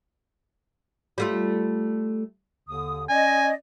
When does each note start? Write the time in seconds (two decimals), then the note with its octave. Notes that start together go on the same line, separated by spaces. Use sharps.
1.18 G3 A3 F4
2.68 D#2 D3 D#6
3.09 C#4 D5 D#5 G#5